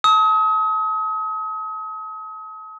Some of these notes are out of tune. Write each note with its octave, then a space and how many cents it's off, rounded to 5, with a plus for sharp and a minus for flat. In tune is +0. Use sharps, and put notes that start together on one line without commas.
A5 +0 D#6 +40